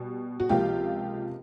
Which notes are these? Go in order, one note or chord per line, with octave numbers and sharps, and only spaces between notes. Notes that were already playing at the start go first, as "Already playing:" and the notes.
Already playing: B2 G3
F#4
C#2 C3 F3 A#3 F4 G4